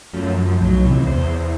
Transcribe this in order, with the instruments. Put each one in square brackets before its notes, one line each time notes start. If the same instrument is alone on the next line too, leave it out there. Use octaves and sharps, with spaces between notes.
[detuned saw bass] F#2 [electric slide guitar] F3 A3 C#4
[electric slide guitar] F3
[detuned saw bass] B1 [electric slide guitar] A2 F#3
[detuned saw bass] C#2 [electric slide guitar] C3 E3
[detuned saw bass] E2 [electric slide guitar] C5